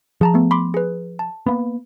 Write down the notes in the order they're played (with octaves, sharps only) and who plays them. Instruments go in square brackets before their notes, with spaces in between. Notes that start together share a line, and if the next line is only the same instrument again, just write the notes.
[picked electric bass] F3 [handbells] G#4 A5 A#5
[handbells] A3 B3
B5 C6 D6
G#4 B4
A5
[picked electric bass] A#3 B3